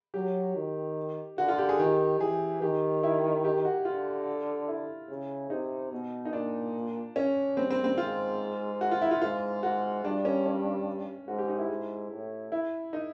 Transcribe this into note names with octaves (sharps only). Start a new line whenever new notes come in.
F#3 G4
D#3
D3 F#4
F4
G4
G#4
D#3 G4
E3 G#4
D#3 G4
E4
G4
F#4
D3 F4
E4
C#3
C3 D#4
B2
D#4
A#2 D4
C#4
G2 C4
C4
C4
G#2 F4
F#4
F4
E4
F4
G#2 F4
G#2 F#4
G2 D4
C#4
C#4
G#2 F#4
G4
D#4
E4
G#2
A2
E4
D#4